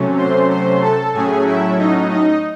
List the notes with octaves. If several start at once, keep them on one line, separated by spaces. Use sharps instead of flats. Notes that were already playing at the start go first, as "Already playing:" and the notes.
Already playing: C3 F#3 A3 C#4
C5 C6
C5 C6
A4 A5
A2 F#3 A3 C#4 G#4 G#5
E4 E5
D#4 D#5
D#4 D#5